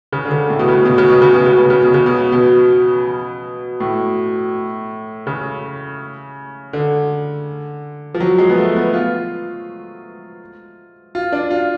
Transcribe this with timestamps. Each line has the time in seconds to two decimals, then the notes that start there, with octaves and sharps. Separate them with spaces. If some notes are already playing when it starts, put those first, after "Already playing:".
0.12 C#3
0.25 D3
0.31 C#3
0.50 A2
0.59 B2
0.68 C#3
0.85 B2
0.98 C#3
1.10 B2
1.22 C#3
1.34 B2
1.46 C#3
1.58 B2
1.70 C#3
1.83 B2
1.94 C#3
2.06 B2
2.32 B2
3.80 A2
5.27 C#3
6.73 D3
8.14 F3
8.20 F#3
8.38 G#3
8.50 B3
8.57 A3
8.76 B3
8.93 F4
11.15 F4
11.32 D4
11.50 F4